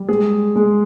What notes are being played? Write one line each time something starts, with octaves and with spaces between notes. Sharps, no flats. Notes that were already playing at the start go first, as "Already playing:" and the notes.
Already playing: G3
G#3 G#4
G#3